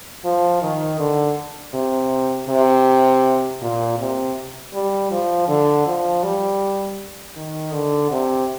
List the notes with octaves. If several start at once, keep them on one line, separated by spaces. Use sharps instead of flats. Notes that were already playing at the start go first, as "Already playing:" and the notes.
F3
D#3
D3
C3
C3
A#2
C3
G3
F3
D3
F3
G3
D#3
D3
C3